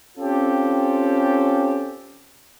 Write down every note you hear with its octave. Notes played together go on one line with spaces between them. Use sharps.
C4 C#4 F4 G4 A4